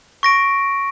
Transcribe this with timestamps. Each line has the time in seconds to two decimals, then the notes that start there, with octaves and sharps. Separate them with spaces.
0.23 C#6 A#6 D7